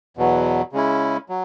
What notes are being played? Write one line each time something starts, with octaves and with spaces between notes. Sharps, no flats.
E2 B2 F#3
C#3 G#3 C#4 E4
F#3